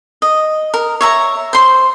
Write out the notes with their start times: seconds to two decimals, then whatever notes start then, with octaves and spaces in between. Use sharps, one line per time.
0.22 D#5
0.74 A#4
1.01 C#5 E5 A#5
1.53 C5 C6